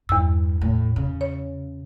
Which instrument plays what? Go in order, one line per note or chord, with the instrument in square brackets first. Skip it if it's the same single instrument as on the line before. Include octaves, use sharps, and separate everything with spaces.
[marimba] E2 E6 [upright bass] G2
[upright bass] A2
C#3
[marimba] C#5